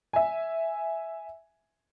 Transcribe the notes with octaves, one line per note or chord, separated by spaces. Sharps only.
E5 G#5